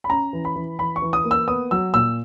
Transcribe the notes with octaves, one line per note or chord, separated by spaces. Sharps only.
B5
C#4 A#5
E3
B5
E3
E3 B5
C#6
E3
D#6
A#3
E6
B3 D#6
F#3 E6
A#2 E6